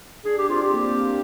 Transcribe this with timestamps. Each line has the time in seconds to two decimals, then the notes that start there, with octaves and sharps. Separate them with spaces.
0.25 D4 G#4
0.38 G4
0.49 C4 F4
0.62 G4
0.74 A#3